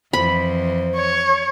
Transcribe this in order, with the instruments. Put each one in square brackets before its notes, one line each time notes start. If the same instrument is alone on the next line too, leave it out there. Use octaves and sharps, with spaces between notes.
[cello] F2 E3 [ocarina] C5 [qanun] B5
[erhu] C#5